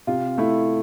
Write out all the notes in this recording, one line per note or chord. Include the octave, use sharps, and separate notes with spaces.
C3 F4
A3 E4